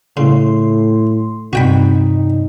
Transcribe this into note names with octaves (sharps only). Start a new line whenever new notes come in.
A2 C#3 C6
G2 C3 D#4 F#4 G5 B5